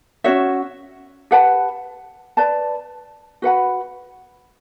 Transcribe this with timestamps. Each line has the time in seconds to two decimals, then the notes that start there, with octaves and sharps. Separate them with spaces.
0.24 C#4 F#4 C#5 E5
1.31 G4 B4 F#5 A5
2.37 B4 D5 A5
3.42 F#4 B4 F#5 B5